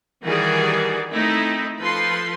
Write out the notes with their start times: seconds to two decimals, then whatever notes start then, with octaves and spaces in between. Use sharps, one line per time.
0.23 D#3 E3 G3 F#4 G#4 D5
1.12 A3 C4 D#4 E4
1.79 F3 A4 B4 C6